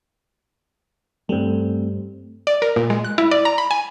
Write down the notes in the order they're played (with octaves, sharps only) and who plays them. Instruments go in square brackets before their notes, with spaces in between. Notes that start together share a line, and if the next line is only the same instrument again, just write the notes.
[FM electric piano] G2 G3 [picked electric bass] A3 C4
[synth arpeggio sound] D5
A#4
A#2
G#3
F#6
E4
D5
A#5
B5
G#5